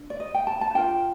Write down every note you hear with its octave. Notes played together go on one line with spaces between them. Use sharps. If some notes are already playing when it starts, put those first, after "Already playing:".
Already playing: D4
D5
D#5
G5
A5
A5
D4 F4 A#4 G5